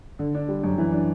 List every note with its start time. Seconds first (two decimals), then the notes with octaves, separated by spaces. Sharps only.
0.19 D3
0.35 D4
0.48 G3
0.64 F#2
0.78 E3
0.92 D4